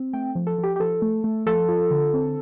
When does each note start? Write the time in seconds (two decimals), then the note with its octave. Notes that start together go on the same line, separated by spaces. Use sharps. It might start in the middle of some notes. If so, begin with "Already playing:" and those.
Already playing: C4
0.13 A3 G5
0.35 F3
0.47 A4
0.58 F3
0.63 G4
0.76 G4
0.80 F3 A4
1.02 A3
1.24 A3
1.46 F3 A4
1.68 F4
1.91 D3
2.14 C4